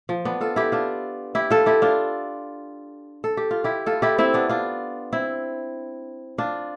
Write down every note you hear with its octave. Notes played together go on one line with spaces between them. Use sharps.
F3
B3 D4
F4 A4
E4 G4
D4 F4
E4 G4
F4 A4
E4 G4
D4 F4
A4
G4
F4
E4 G4
F4 A4
E4 G4
C4 E4
B3 D4
D4 F4
C4 E4
D4 F4